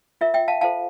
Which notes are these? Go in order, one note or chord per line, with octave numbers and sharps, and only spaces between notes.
F4 A#4 E5
E5 G5
F5 A5
F4 A4 C5 F5 A5